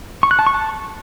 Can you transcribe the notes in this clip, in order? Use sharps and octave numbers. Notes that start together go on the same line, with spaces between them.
C#6
F#6
A5
C#6
A5